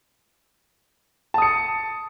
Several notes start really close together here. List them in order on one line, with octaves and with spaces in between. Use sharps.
A5 D#6 C#7